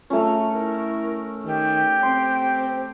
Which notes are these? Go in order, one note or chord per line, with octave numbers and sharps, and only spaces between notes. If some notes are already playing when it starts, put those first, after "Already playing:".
A3 C#4 F4 A#5
E4 A#4
D#3 G4
C4 C6